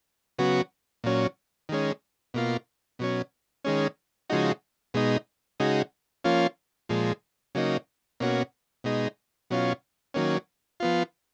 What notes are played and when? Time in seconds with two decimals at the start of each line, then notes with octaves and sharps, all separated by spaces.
0.39 C#3 F#3 B3 F#4
1.04 A#2 F#3 C#4
1.69 D#3 G#3 C#4
2.34 B2 A#3 F4
2.99 B2 F#3 C#4
3.65 D#3 G#3 C#4
4.30 C#3 F3 G#3 D#4 F#4
4.94 B2 G#3 D#4
5.60 C#3 G#3 D#4 F#4
6.24 F3 A#3 C#4 F4
6.89 A#2 F3 G#3
7.55 C#3 F#3 A#3 D#4
8.20 B2 A#3 C#4 F#4
8.84 B2 G#3 D#4
9.51 B2 F#3 C#4 F4
10.14 D#3 F#3 A#3 C#4
10.80 F3 B3 F4